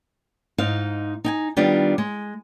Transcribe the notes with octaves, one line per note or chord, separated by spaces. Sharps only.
G#2 D#4 F5
D#4 G5 G#5
D#3 G3 B3 D4 F4 G4
G#3